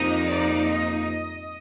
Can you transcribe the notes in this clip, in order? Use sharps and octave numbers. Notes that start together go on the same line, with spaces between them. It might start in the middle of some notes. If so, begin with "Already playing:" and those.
Already playing: F2 C3 F3 A#3 D#4 D#5
D5
D#5